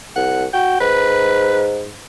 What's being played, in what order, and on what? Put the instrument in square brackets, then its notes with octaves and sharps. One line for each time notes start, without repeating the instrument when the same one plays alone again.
[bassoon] C2 [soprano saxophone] F#5
[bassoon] F#4 [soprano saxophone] G5
[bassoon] G#2 [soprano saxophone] B4